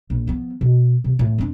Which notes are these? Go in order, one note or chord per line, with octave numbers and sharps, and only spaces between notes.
A#1
F3 B3
B2
C3
A2
F2 D4